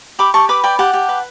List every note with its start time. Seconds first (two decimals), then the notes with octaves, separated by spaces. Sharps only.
0.19 G4 B5 D6
0.34 G4 A5 C#6
0.49 B4 B5 D6
0.64 D5 G5 B5
0.79 G4 F#5 A5
0.93 G4
1.09 B4